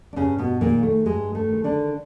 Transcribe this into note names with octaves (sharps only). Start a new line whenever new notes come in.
D4
G2 C#3 C#4
B2 B3
A#2 D#3 G#3 A#3
A3
G2 G#3
A3
D#3 G#3
D3 D4